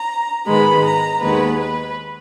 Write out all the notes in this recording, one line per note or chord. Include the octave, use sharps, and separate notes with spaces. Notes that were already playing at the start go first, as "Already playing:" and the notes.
Already playing: A#5
G#2 D#3 G#3 B3 B5
A#5
D#2 D#3 G#3 B3 B4
B4